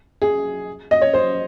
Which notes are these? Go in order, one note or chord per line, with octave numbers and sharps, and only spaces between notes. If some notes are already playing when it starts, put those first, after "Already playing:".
G#4
D#5
C#5
C5